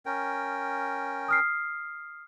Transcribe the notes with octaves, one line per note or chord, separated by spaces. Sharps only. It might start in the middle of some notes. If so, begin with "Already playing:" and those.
C#4 A#4 G5
D#6 F6 C7